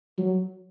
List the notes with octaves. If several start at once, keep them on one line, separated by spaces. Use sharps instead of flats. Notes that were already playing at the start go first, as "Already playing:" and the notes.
F#3